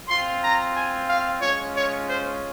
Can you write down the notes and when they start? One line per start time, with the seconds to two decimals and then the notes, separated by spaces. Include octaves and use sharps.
0.08 C4 F4 C6
0.43 A#5
0.74 G#5
1.09 F5
1.41 G#3 C#4 F4 C#5
1.75 C#5
2.07 C5